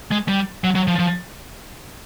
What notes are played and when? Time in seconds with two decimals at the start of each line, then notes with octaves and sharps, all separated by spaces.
0.11 G#3
0.28 G3
0.64 F#3
0.75 F#3
0.87 F3
0.99 F3